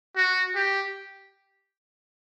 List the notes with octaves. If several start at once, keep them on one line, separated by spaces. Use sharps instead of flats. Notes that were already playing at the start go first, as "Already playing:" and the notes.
F#4
G4